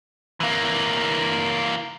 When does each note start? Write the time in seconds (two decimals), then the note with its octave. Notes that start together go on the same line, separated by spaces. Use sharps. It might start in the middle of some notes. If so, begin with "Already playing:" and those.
0.40 E3 A#3